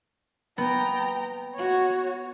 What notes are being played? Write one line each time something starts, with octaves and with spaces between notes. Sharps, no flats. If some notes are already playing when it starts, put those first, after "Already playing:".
B3 G5 A#5
F#4 C#5